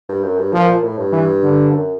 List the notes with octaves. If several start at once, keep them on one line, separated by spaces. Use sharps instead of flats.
G2
F#2
G2
A#2 F3
A#2
A2
G2
E3
D3
F#2